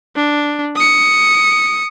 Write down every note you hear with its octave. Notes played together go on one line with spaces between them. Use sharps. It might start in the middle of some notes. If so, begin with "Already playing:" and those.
D4
D#6 C#7